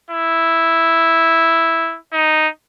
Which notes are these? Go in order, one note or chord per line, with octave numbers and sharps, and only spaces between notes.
E4
D#4